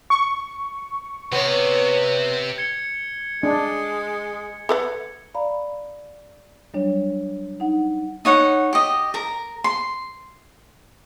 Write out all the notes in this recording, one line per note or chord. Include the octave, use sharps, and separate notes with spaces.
C#6
C3 B3 C#5
G#6 C#7 G7
G#3 D4
A4 B4 F#5
D5 F5 A#5 B5
F#3 G3 D4 C#5
D#4 F#5
D#4 C#5 F#5
G4 D#5
A#4 A#5
C6